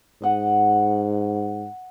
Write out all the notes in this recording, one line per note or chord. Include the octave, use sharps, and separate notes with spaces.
G#2 D#5 F#5